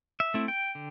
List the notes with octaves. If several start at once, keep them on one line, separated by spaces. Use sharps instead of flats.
E5
A3 C4 E4
G5
D3